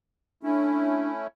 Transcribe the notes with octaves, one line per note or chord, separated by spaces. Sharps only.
A3 C#4 D4 E4